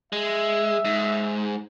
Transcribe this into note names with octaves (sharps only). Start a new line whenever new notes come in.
G#3 E5
G#2